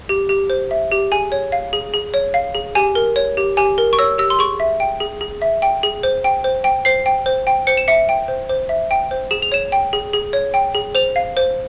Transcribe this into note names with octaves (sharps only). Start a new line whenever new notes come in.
G4
G4
C5
E5
G4
G#4 G#5
C#5
F5
G#4
G#4
C#5
F5
G#4
G4 G#5
A#4
C#5
G4
G4 G#5
A#4
C#6
C#5 E6
G4 E6
C6
G#4 C#6
E5
G5
G#4
G#4
E5
G5
G#4
C5
G5
C5
G5
C5 C7
G5
C5
G5
C5 C#7
E7
E5 C#7
G5
C5
C5
E5
G5
C5
G#4 E7
F7
C#5 E7
G5
G#4
G#4
C#5
G5
G#4
C5 F7
F5
C5